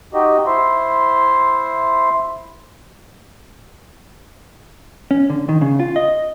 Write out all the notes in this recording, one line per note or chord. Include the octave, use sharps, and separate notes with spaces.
D#4 F#4 G4 D#5
E4 C5 E5 C6
C#4
D3
D#3
C#3
F4
D#5